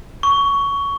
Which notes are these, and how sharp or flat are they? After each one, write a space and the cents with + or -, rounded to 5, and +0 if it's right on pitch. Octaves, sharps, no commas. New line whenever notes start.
C#6 +15